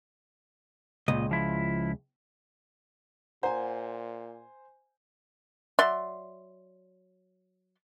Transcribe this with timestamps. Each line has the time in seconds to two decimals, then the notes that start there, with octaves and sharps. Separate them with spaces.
1.08 C#2 A#2 D#5
1.31 F3 E4
3.43 A#2 C5 F#5 G#5 A#5
5.79 F#3 D5 E5 C6